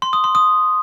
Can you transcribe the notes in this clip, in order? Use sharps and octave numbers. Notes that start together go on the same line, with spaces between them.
C6
D#6
C6
D#6